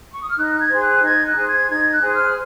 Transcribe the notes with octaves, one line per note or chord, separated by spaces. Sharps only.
C#6
D#6
F6
D#4 F#6
G#6
G#4 C5
F#6
D#4 G#6
F#6
G#4 C5
G#6
D#4 G#6
F#6
G#4 C5
F6